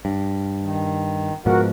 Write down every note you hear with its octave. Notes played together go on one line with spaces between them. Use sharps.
G2
D#3
G#2 B2 F3 F#4 A#4 F#5